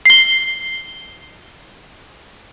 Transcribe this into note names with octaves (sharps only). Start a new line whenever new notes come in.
C7 G7